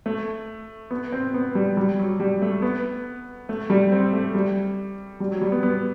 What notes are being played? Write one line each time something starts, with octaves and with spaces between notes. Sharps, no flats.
A3
B3
C4
B3
G3
G3
F#3
G3
A3
B3
A3
G3
C4
A3
G3
G3
F#3
G3
B3
B3